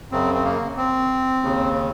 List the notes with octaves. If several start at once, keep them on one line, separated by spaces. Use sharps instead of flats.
F#2 C#3 C4
C4
A#3
C4
D#2 C#3